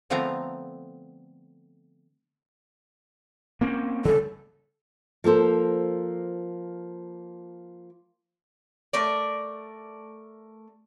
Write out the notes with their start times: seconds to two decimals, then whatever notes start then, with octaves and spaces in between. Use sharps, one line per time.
0.10 D3 F3 A3 B3 C4 A#5
3.61 A#3 C4 C#4
4.05 C#3 G3 A4
5.24 F3 A#3 A4 C5
8.93 A3 A#4 D5